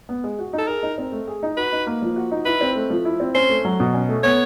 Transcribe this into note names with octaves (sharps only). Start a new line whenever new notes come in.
B3
G#3
F#4
D#4
A4
G#4 A#4
D#4
C4
A3
G#4
D#4
F#4 B4
D#4
A#3
F3
F#4
D#4
E4 B4
C4
A3
F3
E4
C4
C#4 C5
A3
F#3
B2
C#4
A3
B3 C#5